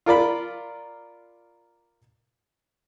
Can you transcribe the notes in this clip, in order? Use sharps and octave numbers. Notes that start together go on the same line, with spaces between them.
F4 A#4 D5 B5